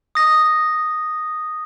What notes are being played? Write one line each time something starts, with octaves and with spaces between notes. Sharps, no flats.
D#6 A#6